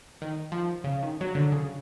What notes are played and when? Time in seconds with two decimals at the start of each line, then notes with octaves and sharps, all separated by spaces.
0.22 D#3
0.52 F3
0.84 C#3
1.03 D#3
1.21 F#3
1.35 D3
1.52 C#3